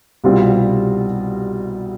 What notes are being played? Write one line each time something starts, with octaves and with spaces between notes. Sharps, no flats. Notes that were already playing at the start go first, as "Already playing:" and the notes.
C2 B2 G3 C4 F4